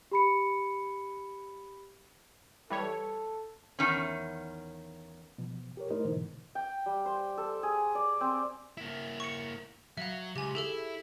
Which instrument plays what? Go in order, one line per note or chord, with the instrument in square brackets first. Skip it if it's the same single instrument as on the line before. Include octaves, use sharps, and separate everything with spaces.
[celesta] G4 B5 C#7
[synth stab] E3 G3 C#5 [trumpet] A4
[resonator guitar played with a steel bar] E2 D#3 C#4
[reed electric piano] B2 F3
G4 A#4 C#5
A3 D#4 E4 A#4 C5 D#5
G#2 B2 D3 E3
[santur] G5
G3
C5
A4
G#4
D5
C4
[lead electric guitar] A#3 E4
[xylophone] C#6 C#7
[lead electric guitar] F#3 [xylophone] E5 F5
[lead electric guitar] C#2 [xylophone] G4 G#5
[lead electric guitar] E4 [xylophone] G#4 A4 E5